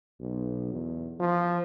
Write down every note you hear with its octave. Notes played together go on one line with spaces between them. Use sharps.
B1
E2
F3